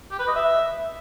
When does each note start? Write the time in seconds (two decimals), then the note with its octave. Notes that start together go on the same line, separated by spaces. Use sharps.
0.11 G4
0.19 B4
0.27 D#5
0.35 E5